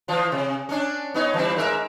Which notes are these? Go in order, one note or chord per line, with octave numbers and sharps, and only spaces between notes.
E3 F3 F4
C3
C#4 D4
B3 D#4 C#5
E3 G3 C4
G#2 A#4 E5